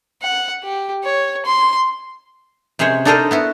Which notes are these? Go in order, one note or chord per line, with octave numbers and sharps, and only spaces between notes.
F#5
G4
C#5
C6
C3 G#3 C#4 C5 C#5
D4 D#4 A4 A#4 C5 D#5
B3 E4 F#4